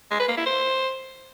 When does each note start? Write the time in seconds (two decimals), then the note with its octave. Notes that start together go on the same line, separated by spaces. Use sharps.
0.11 G#3
0.20 B4
0.28 A#3
0.37 E4
0.46 C5